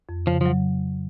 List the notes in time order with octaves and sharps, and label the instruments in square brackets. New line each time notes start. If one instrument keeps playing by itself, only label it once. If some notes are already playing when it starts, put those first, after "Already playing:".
[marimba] F2
[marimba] C#3 [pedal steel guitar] F3
[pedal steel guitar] F3 [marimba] F#3